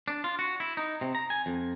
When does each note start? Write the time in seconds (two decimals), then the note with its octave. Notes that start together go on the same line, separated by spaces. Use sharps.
0.08 D4
0.24 F4
0.39 F#4
0.60 E4
0.77 D#4
1.01 C3
1.15 A#5
1.30 G#5
1.46 F2